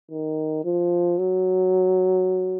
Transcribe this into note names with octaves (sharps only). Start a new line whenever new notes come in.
D#3
F3
F#3